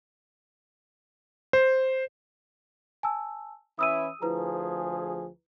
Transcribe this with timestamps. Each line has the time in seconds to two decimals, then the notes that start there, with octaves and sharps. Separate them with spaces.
1.53 C5
3.03 G#5 A5 E6
3.79 E3 C#4 E4 D#6 E6 D#7
4.22 D2 F3 E4 G#4 B4 A#5